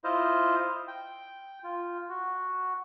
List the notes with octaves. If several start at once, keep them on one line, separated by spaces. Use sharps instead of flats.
E4 F4 C5 D#5 F5
G5
F4
F#4